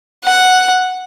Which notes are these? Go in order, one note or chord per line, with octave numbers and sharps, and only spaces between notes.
F#5